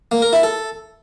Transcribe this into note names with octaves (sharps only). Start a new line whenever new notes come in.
A#3
A#4
E4
A4